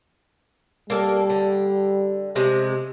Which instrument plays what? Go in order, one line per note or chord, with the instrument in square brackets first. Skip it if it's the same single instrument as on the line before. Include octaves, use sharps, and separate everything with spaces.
[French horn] G3 [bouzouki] A#3 A4
[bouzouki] D3
C3 G#3